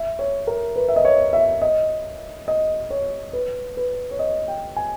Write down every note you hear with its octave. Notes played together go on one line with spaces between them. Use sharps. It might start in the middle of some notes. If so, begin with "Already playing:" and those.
Already playing: E5
C#5
A#4
B4
E5
D#5
C#5
E5
D#5
D#5
C#5
B4
B4
C#5
D#5
G5
G#5